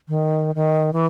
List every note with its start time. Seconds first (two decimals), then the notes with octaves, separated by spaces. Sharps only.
0.08 D#3
0.55 D#3
0.93 E3